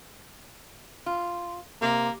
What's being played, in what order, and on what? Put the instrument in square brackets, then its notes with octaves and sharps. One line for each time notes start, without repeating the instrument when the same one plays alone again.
[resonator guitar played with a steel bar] F4
[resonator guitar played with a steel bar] C3 [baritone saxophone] A#3